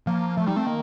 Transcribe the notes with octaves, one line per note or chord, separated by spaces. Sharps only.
F3 A#3
F3 A3
G3 D#4
A3 C4
D#3 A#3